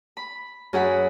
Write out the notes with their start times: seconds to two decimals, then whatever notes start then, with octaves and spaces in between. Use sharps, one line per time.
0.17 B5
0.73 F#2 G#4 F#5 B5